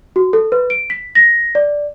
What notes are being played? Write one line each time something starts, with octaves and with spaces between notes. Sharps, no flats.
F#4
A4
B4
D7
B6
A#6
D5